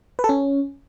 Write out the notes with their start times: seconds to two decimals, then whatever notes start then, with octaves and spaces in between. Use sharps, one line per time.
0.19 B4
0.24 A4
0.29 C#4